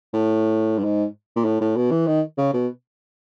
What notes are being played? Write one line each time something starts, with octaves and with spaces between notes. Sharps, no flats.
A2
G2
G#2
A#2
A2
A2
B2
E3
D#3
C#3
B2